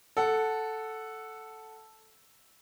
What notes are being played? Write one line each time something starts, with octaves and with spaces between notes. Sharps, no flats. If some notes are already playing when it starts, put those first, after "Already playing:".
A4 F#5